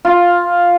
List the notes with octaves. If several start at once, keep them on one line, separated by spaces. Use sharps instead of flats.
F4